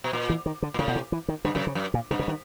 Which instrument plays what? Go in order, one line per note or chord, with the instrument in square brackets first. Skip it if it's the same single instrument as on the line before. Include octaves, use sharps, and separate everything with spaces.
[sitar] B2
A#2
[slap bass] E3
D#3
D3
[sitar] A#2
[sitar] A2 [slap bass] C#3
[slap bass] B2
C3
E3
D#3
[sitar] G2 [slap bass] D3
[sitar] F#2 [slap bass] C#3
[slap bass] C#3
[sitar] F#2
[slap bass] A#2
[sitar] G2 [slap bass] C3
[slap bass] C#3
D#3